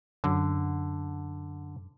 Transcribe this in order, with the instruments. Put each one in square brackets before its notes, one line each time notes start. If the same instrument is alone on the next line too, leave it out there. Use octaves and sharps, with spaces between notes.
[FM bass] F#2 [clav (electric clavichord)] D3